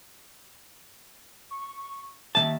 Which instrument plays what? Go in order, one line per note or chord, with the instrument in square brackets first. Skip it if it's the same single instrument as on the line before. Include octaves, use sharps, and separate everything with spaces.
[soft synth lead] C#6
[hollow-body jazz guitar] D#2 F3 A5 [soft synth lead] E5